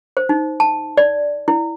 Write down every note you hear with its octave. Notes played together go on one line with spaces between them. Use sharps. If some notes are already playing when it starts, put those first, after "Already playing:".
C5
D#4
A5
D5
E4